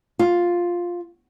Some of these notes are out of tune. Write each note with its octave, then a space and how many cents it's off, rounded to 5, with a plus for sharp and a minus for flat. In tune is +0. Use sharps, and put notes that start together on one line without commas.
F4 +5